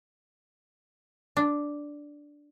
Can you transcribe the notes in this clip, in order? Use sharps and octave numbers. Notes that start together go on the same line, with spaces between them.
D4